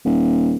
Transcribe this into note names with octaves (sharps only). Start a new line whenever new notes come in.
D#1